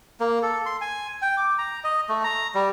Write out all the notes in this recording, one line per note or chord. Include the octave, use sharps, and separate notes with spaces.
A#3
A4
C6
G#5
G5
D6
A#5
D#5
A3
A#5
G3